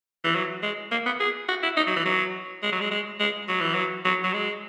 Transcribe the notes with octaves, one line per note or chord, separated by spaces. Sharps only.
E3
F#3
G#3
A#3
B3
G#4
F#4
E4
D#4
F#3
E3
F#3
G#3
F#3
G#3
G#3
G#3
F#3
E3
F#3
F#3
F#3
G#3